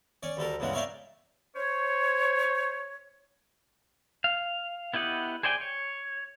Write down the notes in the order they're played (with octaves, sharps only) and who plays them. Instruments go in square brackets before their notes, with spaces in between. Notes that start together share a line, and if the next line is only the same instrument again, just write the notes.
[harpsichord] C#4 C#5 D5
D2 G3 A4 A#4
C#2 G2 C#3 E3 G#3 F#5
A#4 C#5 D5 E5 F5 G5
[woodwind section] C5 C#5
[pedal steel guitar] F5
B3 E4 G4 D#5 F#5
G#4 C5 D5 G5 G#5
C#5